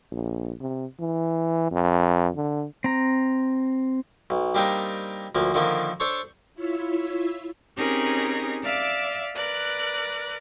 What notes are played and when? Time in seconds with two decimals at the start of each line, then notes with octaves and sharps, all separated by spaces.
0.12 A#1
0.61 C3
1.00 E3
1.72 F2
2.36 D3
2.84 C4 A#5
4.30 B1
4.55 G3 A#3 C4 D4 D#4
5.35 D2 F3 A#3
5.54 D3 D#3 F3 A#3 D4
6.00 D4 A4 C5 C#5
6.54 E4 F4 C#5 E5
7.77 C4 C#4 D#4 G4 G#4 A#4
8.63 D5 E5 F5 D6 E6
9.35 A#4 B4 D5 F#6